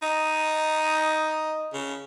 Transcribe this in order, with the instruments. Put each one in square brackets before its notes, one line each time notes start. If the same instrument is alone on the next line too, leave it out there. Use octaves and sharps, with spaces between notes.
[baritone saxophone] D#4 [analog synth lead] D#5
[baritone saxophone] C#3